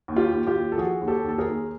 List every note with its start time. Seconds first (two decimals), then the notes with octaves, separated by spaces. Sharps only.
0.08 D#2
0.16 F4 G4
0.32 D#2
0.47 F4 G4
0.55 D#2
0.72 A4
0.78 F3 F#4 G#4
1.01 D#2
1.08 G4 A4
1.24 D#2 A4
1.38 G#4 A#4
1.47 D#2